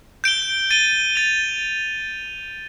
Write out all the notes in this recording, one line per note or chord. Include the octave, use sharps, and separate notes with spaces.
G6 D7 G7
A6 D#7 G7
A6 D7 F7